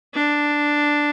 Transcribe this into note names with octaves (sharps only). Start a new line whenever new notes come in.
D4